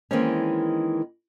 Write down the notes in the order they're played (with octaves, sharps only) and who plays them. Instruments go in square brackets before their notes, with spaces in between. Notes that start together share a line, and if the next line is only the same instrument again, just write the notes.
[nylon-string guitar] D#3 E3 G#3 A#3 C4 C#4